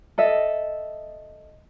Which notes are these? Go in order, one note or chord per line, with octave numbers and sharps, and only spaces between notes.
A4 D#5 E5